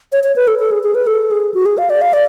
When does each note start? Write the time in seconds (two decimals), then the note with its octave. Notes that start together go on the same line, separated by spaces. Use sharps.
0.12 C#5
0.24 C#5
0.36 B4
0.48 A4
0.59 A4
0.71 G#4
0.83 G#4
0.95 B4
1.07 A4
1.31 G#4
1.54 F#4
1.66 G#4
1.78 F5
1.90 D5
2.02 F5
2.13 D5